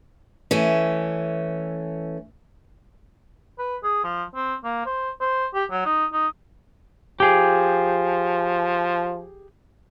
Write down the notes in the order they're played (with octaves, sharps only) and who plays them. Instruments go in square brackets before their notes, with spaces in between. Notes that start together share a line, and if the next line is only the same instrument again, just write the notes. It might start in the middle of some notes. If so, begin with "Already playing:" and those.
[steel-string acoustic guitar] E3 A3 C#4
[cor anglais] B4
G#4
F3
C4
A#3
C5
C5
G4
F#3
D#4
D#4
[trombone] F3 [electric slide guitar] G4 G#4